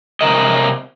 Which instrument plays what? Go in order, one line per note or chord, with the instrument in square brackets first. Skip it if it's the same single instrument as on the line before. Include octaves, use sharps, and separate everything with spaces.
[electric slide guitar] C3 E3 A#4 D#5